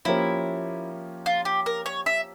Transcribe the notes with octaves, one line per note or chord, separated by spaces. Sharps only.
F3 A#3 C#4 E4 G4 A#4
F4
G4
A#4
C#5
E5